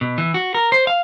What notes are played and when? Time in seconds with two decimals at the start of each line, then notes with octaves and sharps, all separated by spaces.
0.01 B2
0.18 E3
0.34 F#4
0.54 A#4
0.72 C5
0.87 F5